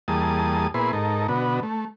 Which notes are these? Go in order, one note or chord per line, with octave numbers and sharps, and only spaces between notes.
E2 G3 A#3 G#4 A5 D#6
A#2 B3 E4 G#4 B4 C6
G#2 D#4 A4 A#4
B2 D3 B3 F#4
A3